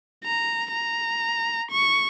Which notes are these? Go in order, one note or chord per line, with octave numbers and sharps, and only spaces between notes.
A#5
A#5
C#6